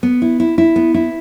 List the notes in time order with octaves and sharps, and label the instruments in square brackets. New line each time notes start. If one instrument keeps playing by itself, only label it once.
[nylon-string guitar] B3
E4
E4
E4
B3
E4